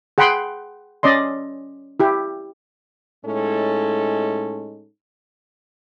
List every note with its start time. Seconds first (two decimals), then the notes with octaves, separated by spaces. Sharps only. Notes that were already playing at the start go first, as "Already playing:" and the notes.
0.18 G#4 F#5 G5 B5 C6
1.03 C#4 D5 D#5 C6
2.00 E4 G4
3.26 A2 G#3 C#4 D#4 A4